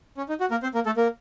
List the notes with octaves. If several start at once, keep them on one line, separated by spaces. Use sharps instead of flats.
C#4
D#4
F#4
A#3 A#4
C4 C5
A#3 A#4
A3 A4
A#3 A#4